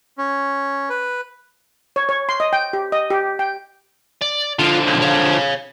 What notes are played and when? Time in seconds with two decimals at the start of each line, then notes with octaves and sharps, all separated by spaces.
0.18 C#4
0.90 B4
1.96 C#5
2.09 C#5
2.29 C6
2.40 D#5
2.53 G5
2.73 G4
2.92 D#5
3.10 G4
3.39 G5
4.22 D5
4.59 D3 F3 F4
4.87 B1 F2
5.02 C#5 F5